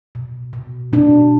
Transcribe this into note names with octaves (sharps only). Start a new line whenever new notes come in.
B2
B2
B2 D4